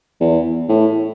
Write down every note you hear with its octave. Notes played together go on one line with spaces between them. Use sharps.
E2
A2